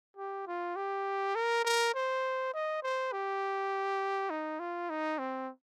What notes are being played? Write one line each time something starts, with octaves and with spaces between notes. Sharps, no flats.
G4
F4
G4
A#4
A#4
C5
D#5
C5
G4
D#4
F4
D#4
C4